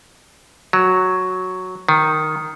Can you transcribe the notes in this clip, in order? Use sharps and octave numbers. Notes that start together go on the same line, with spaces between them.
F#3
D#3